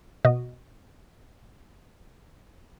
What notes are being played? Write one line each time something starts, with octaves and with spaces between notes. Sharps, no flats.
B2 F#4 D#5